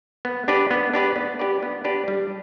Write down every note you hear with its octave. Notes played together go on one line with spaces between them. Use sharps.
B3
D4 G4 B4 D5
B3
D4 G4 B4 D5
B3
D4 G4 B4 D5
B3
D4 G4 B4 D5
G3